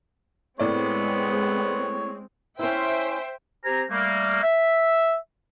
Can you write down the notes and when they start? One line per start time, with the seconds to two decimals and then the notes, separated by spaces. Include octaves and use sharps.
0.59 A2 G#3 B3 C4 C#5 D5
2.59 C#4 E4 C5 E5 G5
3.65 C4 G4 C5 G#5 A#5
3.89 G3 A3 A#3
4.42 E5